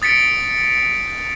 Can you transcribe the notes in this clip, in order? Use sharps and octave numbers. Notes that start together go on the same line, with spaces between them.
D#6 A6 B6 C#7 D7